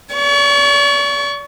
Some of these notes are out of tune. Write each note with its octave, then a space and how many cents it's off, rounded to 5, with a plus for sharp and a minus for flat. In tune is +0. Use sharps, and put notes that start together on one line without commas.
D5 -40 C#6 +20